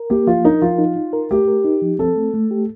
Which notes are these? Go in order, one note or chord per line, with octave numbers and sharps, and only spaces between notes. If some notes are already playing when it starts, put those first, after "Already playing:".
Already playing: A#4
A#3 G4
F3 F4
D#4 A#4
F3 F4
D#4
D#4
A#4
A3 G4
A#4
D#4
F3
C4 A4
A3
A3
G4